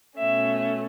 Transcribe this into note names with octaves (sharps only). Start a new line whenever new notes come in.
B2 A3 C#4 E5